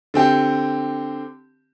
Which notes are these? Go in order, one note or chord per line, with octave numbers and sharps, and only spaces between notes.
D3 C4 G4